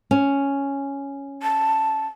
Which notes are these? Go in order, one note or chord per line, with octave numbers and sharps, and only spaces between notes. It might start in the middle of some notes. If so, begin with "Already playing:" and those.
C#4
A5